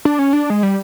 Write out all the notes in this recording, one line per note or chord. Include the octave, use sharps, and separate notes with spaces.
D4
C#4
D4
G#3
G3